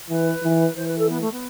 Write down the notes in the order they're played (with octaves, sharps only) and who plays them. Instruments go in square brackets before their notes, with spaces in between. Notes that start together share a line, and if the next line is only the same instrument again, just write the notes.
[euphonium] E3 [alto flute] B4
[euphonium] E3
[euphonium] E3 [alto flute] C5
[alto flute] B4
A4
B3
A3
B3